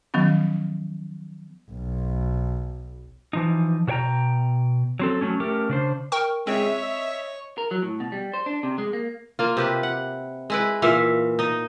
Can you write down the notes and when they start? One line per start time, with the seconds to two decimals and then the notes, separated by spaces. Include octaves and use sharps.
0.14 D#3 F3 F#3 B3 C#4
1.69 B1
3.33 E3 F3 D#4
3.87 B2 F#4 C#5 G5 A#5
4.99 F#3 C4 A4
5.21 F#3 A3 C#4
5.40 A3 C#4 G4 A#4
5.69 C#3 D4 C5
6.12 A#4 G5 C#6
6.47 G#3 C4 C#5 E5
6.82 D#5
7.58 A#4
7.71 F#3
7.82 A2
8.00 B2
8.12 G3
8.34 C5
8.46 D4
8.63 C3
8.78 G#3
8.93 A#3
9.39 A#3 F4
9.57 C3 G4 B4
9.83 F#5
10.50 G#3 E4 B4
10.82 A#2 E3 E5 F5
11.39 D#4 D#5